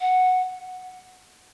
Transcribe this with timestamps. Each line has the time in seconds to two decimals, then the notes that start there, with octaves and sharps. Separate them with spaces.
0.01 F#5